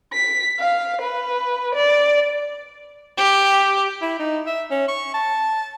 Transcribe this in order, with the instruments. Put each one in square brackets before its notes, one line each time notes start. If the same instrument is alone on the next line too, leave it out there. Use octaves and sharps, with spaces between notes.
[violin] B6
F5
B4
D5
[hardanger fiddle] G4
[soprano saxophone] E4
D#4
E5
C#4
C#6
A5